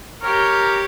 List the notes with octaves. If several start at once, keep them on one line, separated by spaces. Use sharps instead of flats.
G4 A#4 C#5